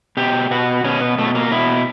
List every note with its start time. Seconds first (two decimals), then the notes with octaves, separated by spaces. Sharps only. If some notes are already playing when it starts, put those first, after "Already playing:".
0.17 B2 G4
0.51 B2 F#4
0.84 B2 C#4
1.01 B3
1.18 B2 A3
1.35 A#3
1.52 B2 E4